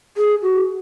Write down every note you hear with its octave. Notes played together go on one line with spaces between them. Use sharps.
G#4
F#4